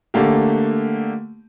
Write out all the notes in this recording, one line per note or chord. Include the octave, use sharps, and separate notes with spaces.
D3 A3 A#3 G4